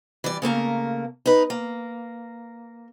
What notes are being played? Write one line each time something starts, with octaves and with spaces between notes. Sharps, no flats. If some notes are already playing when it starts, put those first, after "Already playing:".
E3 G3 D5
C#3 A3 A#3 A#4
D#4 B4
A#3